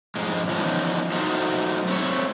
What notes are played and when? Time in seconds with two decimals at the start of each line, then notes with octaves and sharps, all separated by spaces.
0.16 F2 G#2 G#3
0.48 E3 F3 B3 C#4 D#4
1.12 F#3 A3 D#4 C5
1.87 A3 C4 C#5